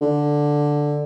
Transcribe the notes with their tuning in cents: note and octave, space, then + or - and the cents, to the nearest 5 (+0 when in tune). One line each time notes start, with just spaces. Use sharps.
D3 +0